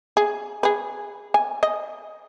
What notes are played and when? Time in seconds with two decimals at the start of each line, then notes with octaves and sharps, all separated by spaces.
0.17 G#4
0.63 G#4 B4
1.34 G#5
1.63 D#5